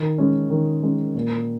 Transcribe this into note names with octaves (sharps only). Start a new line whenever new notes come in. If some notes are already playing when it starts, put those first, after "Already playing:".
Already playing: D#3
G#3 C#4
D#3
G#3 C#4
A#2